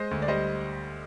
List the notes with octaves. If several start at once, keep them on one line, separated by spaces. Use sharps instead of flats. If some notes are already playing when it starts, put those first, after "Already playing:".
Already playing: G#3 C5 D#5
D2
D5
G3 C5 D#5